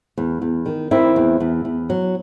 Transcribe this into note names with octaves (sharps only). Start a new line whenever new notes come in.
E2
E2
D#3
D#3 C4 E4
E2
E2
E2
F#3